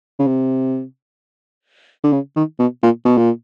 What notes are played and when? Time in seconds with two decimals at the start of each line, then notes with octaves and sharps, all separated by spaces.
0.19 C#3
0.27 C3
2.04 D3
2.13 C#3
2.36 D#3
2.59 B2
2.83 A#2
3.06 B2
3.18 A#2